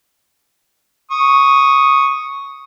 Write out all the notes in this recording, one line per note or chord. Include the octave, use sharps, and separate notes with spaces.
C#6 D#6